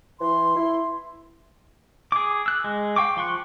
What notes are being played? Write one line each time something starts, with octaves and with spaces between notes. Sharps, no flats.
E3 C6
E4
G#4 D6
E6 F#6
G#3
F5 G5 C#6 D6
F3 C6 C#6 F#6